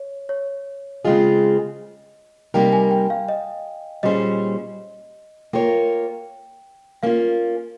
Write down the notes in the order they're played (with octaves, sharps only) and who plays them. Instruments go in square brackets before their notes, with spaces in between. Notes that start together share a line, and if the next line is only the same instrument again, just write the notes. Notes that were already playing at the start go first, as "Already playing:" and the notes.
Already playing: [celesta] C#5
C#5
[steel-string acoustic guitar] C#3 G#3 C4 F4 G#4 [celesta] D#5
[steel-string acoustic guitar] C3 G3 A#3 D#4 A#4 [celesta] G5
[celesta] G#5
G5
F5
D#5
[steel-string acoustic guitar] A#2 G3 C#4 G#4 C5 [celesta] D#5
[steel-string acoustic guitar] A#3 F4 A#4 C#5 [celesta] G5
[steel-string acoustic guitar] A#3 C#4 F4 [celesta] F5